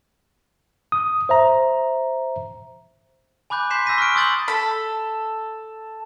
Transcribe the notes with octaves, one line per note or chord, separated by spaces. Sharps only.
D#6
C5 E5 A#5
G#5 B5 D6 F#6 G6
C6 G6 B6 C7 E7
G#5 E6 G6 A#6 B6 D#7
C#6 F6 F#6 D7
C6 D#6 E6 G6 A6 F#7
A4 B5